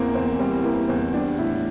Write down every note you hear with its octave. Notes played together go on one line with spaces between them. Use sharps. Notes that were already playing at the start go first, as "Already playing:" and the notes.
Already playing: E2 E3 A#3 C4
E2 C4
G3 C4
E3 A#3
E2 C4
G3 D4
A2 E4